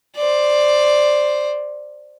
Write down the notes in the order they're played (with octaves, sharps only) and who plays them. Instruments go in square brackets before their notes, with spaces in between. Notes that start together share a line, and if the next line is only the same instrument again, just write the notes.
[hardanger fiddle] C5 D5